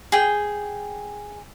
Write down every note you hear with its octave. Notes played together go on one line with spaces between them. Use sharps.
G#4 G5